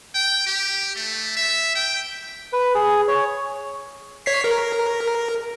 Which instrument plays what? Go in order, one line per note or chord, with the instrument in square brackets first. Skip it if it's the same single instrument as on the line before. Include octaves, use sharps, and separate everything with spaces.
[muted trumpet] G5
G4
A3
E5
G5
[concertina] B4
G#4
C#5
[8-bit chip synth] C#5 B6 C7
A#4